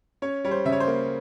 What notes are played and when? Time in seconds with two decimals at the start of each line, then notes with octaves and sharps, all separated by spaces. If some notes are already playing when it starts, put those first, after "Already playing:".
0.22 C#4 C#5
0.45 G3 C#5
0.51 C5
0.65 C#3 E5
0.72 C#5
0.80 C5
0.87 A#3